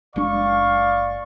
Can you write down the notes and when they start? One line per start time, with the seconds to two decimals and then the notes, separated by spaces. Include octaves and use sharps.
0.16 F#1 G#3 D4 D5 F5 C#6